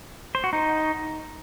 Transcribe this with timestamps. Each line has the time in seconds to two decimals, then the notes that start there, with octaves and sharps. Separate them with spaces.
0.35 C5
0.44 F#4
0.53 D#4